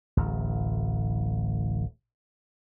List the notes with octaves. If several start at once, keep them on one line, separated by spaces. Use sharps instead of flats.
D1 A1